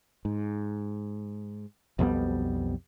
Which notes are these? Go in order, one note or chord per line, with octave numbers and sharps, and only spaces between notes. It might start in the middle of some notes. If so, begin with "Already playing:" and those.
G#2
B1 F2 G3 B3